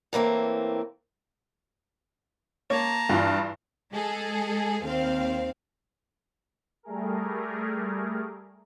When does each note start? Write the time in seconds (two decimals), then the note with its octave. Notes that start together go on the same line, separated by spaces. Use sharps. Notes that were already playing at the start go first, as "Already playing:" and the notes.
0.13 A2 E3 A#3 C4
2.70 A#3 C#5 A5 A#5
3.09 G2 E3 F4
3.91 G#3 G#4 A4
4.85 D#2 C4 F5
6.83 G3 A3 G#4 A#4